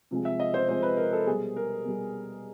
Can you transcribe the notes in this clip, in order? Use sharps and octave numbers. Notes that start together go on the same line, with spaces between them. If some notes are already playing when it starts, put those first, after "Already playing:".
C3 F3 G#3
E5
D#5
C5
C3 F3 G#3 C5
B4
A#4
A4
B2 G3 G#4
A#4
B2 G3